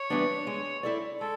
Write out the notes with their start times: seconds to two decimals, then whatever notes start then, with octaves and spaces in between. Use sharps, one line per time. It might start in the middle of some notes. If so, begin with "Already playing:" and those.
Already playing: C#5
0.10 E3 G3 B3 D4
0.47 G#3
0.83 C4 E4 A4 D5
1.20 G#3 A4